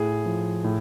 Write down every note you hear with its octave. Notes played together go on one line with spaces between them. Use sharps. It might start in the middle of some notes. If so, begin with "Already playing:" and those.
Already playing: A2 G#4
F3
A2